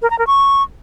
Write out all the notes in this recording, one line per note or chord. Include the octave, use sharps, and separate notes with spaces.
A#4
A#5
A#4
C#6